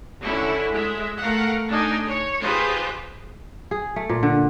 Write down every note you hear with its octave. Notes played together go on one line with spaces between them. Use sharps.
D3 C#4 E4
G#3 E5
A3 A#4 F5 F#5
A3 D4 D#4 G#5
C#5
D#4 F4 G4 G#4 B4 C5
G#4
A3
A#2
D3